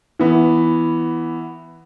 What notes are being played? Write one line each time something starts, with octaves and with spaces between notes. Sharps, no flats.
E3 B3